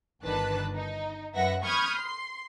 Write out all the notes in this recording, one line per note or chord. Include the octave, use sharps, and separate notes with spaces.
G1 D#3 D4 B4 A5 F#6
D#4
F#2 B4 E5 F#5 A#6
B5 C#6 D#6 F6 G6 G#6
C6 C7